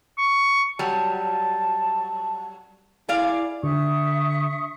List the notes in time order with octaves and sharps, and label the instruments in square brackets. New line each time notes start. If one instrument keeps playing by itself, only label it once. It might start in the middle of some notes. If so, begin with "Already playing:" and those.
[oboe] C#6
[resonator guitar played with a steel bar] F#3 G3 [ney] A5
[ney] E4 [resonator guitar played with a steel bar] G#4 D5 F5
[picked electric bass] D3 [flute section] E5 C#6 D#6